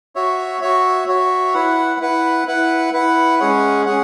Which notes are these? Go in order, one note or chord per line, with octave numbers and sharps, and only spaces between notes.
F#4 C#5 E5
F#4 C#5 E5
F#4 C#5 E5
E4 B4 F#5
E4 B4 F#5
E4 B4 F#5
E4 B4 F#5
G#3 C#4 G#4 C#5 F#5
C#4 G#4 C#5 F#5